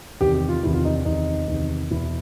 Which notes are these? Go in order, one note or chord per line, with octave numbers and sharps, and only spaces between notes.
E2 C3 D#3 G4
G4
F4
E2 C3 D#3 E4
F4
D#4
D4
E2 C3 D#3 D#4
E2 C3 D#3
E2 B2 E4